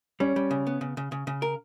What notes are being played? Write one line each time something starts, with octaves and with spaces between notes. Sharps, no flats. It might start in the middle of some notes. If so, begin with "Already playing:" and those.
G3 C#4
G3
C#3
B3
C#3
C#3
C#3
C#3
A#4